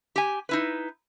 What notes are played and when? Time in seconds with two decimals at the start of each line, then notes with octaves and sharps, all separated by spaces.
0.16 G4 G#5
0.49 D#4 E4 B4